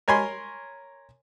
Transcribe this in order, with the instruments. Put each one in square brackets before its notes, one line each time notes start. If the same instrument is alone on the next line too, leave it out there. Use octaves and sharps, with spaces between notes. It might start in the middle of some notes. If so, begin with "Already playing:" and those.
[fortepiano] A#4 C#5 G#5 B5 C6